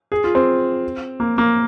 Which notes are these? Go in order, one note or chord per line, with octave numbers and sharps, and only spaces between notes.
G#4
F4
C4
A#3
A#3